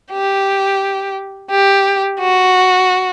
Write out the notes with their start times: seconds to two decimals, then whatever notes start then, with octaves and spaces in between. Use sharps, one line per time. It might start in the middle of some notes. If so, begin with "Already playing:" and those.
0.12 G4
1.50 G4
2.20 F#4